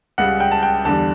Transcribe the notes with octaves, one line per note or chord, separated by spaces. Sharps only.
C#2 C#3 G3 F#5
G5
A5
G5
E2 D3 G3 A5